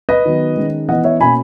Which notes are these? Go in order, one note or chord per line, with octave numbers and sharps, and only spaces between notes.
B4 D#5
D#3 F#3 B3
D#3 G#3 C#4
E3 B3 D#5 F#5
C#5 E5
B2 A#3 C#4 G#5 B5